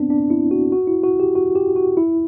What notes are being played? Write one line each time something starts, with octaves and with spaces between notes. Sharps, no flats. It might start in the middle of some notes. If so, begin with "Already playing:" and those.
Already playing: B3 C4 D4
D4
E4
F#4
F#4
E4
F#4
G4
F#4
G4
F#4
E4